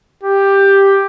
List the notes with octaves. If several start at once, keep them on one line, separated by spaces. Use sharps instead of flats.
G4